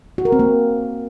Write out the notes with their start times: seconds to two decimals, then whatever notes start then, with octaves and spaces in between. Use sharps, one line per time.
0.18 F#4
0.25 A#4
0.32 C4
0.39 A#3